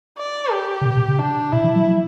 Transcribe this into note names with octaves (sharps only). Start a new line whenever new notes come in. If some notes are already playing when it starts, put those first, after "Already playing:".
D5
G4
C#3
B2
B2
C#3
D4
B2 E4
E3
F#3
F#3